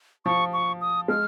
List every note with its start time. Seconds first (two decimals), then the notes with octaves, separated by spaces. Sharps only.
0.25 F3 C#6
0.53 C#6
0.81 D#6
1.08 G#3 F6